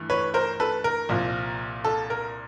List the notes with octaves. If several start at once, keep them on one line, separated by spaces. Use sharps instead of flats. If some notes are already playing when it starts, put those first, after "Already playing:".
Already playing: G2 E3 A3
B4 C#5
A#4 C5
A4 B4
A#4
C2 A#2 F3
A4
A#4